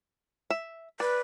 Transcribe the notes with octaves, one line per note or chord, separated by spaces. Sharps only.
E5
B4 D5